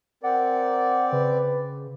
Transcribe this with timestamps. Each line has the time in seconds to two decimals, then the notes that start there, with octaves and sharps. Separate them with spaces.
0.23 C4 A#4 D5 F#5
1.12 C#3 B4